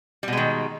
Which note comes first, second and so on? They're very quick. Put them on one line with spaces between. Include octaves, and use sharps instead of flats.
G3 B2 G#3 D#3